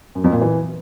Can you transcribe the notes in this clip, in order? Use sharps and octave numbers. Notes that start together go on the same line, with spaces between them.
F#2
F2
A#2
E3